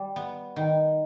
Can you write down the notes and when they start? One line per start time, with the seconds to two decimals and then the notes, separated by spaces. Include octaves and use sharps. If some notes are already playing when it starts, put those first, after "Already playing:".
Already playing: G3
0.16 B3
0.56 D#3